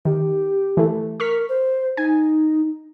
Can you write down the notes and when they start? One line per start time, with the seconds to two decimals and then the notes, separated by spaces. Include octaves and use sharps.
0.05 D#3 G4
0.77 E3 A3
1.20 A#4 C#6 F6 B6
1.49 C5
1.97 D#4 G#5